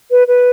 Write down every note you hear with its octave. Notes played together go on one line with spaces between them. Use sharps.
B4
B4